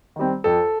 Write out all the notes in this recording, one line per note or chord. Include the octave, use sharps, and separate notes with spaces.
D#3 G3 C4
F2 A4